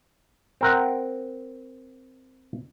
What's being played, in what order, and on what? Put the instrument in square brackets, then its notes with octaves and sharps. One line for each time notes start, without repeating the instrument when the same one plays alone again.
[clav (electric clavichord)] C4 A#4 F#5